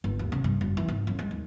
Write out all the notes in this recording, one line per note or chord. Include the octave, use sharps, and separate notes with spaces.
G1
D#2
C#3
G2
F#1
E3
G#1
F#2
G#3
D#2